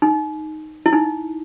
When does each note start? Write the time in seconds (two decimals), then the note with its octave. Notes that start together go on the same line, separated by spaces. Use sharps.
0.02 D#4
0.86 E4
0.93 D#4